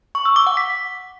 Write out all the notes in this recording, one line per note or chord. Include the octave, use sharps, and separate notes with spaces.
C#6
E6
D6
F#5
B6